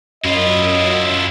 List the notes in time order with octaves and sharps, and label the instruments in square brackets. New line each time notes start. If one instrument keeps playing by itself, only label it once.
[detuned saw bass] F#2 [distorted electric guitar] E4 F4 [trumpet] D#5